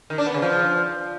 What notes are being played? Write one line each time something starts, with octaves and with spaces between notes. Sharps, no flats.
D#3
D4
B3
C#3
F3